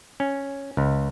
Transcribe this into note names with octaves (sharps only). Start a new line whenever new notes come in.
C#4
C#2